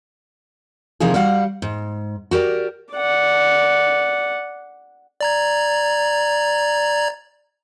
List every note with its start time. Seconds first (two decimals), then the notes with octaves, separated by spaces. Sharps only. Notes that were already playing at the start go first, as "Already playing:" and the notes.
1.00 C3 F3 A#3 D#4 E4 G#4
1.14 G3 F#4 F5 F#5
1.62 G#2
2.31 F#4 G4 A#4 D5
2.93 D5 F#5
5.21 D5 A#5 G#6